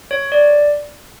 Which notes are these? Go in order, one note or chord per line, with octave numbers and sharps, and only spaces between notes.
C#5
D5